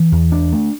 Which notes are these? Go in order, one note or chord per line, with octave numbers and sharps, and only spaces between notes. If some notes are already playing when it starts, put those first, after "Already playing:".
Already playing: E3
E2
D4
A3